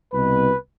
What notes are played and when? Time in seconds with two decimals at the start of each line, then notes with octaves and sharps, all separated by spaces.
0.12 C2 B2 B4